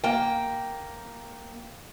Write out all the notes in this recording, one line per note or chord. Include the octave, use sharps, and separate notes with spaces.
A#3 G5